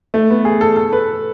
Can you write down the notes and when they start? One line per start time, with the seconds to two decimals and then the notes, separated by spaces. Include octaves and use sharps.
0.14 A3
0.30 B3
0.45 G#4
0.61 A4
0.76 A4
0.93 B4